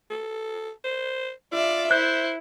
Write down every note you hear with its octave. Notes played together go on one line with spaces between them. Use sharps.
A4
C5
F4 D5 E5
E4 C5 F#6 G6